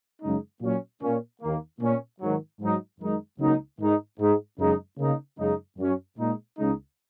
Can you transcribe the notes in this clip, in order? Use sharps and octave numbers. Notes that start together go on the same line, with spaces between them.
F#2 C#3 G#3 D#4
A#2 F#3 C#4
A#2 A#3 C#4
D#2 D#3 A#3
A#2 A#3 C#4
G#2 D#3 F#3
G#2 F#3 D#4
F#2 D#3 G#3 D#4
C#2 C#3 F#3 A#3 D#4
G#2 D#3 G#3 D#4
G#2 G#3 D#4
F#2 C#3 G#3 D#4
C#3 A#3 D#4
F#2 C#3 G#3 D#4
F#2 F#3 C#4
A#2 G#3 D#4
C#2 C#3 G#3 D#4